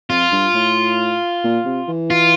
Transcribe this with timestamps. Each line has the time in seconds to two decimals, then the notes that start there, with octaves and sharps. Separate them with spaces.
0.10 F2 F4
0.32 G2
0.54 A2
1.44 A#2
1.65 C3
1.88 E3
2.10 F4